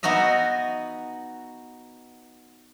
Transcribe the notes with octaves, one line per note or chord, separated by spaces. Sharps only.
B3 D#4 F#4 D#5 E5